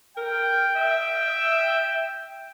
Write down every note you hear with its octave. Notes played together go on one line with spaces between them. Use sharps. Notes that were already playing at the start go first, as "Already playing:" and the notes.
A#4 G5
E5